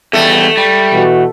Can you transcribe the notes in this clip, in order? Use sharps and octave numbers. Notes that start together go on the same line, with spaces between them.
E2 G3 A3
G3
B2 E3 F#4